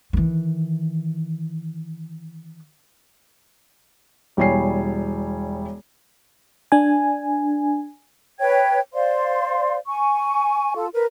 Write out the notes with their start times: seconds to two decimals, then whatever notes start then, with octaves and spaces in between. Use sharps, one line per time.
0.13 D#3 E3
4.37 E1 G3 E4 C#5 G#5 C7
6.72 D4 G#5
8.39 B4 C#5 G5 G#6
8.93 C5 D5 F5 C6
9.87 G#5 C#6
10.75 F4 A4
10.93 A#4 B4